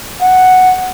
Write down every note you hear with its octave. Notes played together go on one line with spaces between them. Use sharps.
F#5